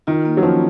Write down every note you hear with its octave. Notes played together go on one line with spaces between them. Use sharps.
D#3 F4
A#3
F#3
F3 C#4